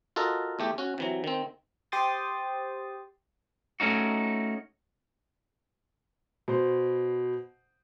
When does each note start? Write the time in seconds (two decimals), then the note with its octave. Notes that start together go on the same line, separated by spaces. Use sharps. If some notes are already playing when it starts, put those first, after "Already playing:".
0.16 F4 F#4 A4 A#4 D#5
0.59 E2 A3 G4
0.78 C#4 F#4
0.98 C3 E3 F#3
1.24 D#3 C4
1.92 G4 C5 G5 C6 D#6 A6
3.80 A3 C#4 D#4 F#4
6.48 B2 C5